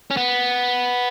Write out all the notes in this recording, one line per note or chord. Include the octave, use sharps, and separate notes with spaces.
C#4
B3